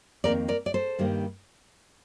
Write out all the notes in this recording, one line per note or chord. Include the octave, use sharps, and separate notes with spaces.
F2 D#3 A#3 A#4 D5
A#4 D5
D5
A4 C5
G2 D#3 G3 A#3